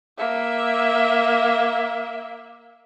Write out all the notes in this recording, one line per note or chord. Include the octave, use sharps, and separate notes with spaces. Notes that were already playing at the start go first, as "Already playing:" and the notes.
A#3 E5